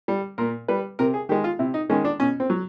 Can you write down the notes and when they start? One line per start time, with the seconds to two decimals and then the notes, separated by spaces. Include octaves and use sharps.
0.08 G3
0.38 A#2 A#4
0.68 G3 B4
0.99 C3 A#4
1.14 G#4
1.29 D#3 G#3 G4
1.44 F4
1.59 C3 E4
1.74 D#4
1.90 D#3 G#3 C#4
2.05 D4
2.20 B2 C#4
2.40 C4
2.50 F#3